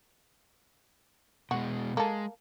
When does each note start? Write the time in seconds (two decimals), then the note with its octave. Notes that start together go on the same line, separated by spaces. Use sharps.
1.51 B2 G#3 F#4
1.97 G#3 A#3 A4